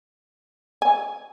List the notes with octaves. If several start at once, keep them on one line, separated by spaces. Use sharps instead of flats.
G#5